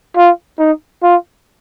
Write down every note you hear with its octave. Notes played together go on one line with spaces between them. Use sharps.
F4
D#4
F4